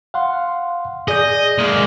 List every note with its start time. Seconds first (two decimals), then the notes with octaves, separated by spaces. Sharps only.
0.14 F5 F#5 C6
1.08 G#4 D5 D#5 G6
1.58 G#3 A#3